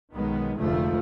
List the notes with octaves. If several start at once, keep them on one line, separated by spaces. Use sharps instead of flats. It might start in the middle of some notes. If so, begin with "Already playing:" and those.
B1 D#3 G#3 B3
F1 D2 F3 G#3 A3